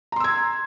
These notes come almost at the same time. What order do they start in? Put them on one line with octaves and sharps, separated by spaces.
A#5 C6 E6 G#6